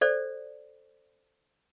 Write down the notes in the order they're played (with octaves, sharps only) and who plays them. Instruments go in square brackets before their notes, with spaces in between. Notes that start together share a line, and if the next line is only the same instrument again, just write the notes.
[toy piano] A4 C5 D5